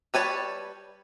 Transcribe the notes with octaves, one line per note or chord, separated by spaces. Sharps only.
G3 B4 C#5 A5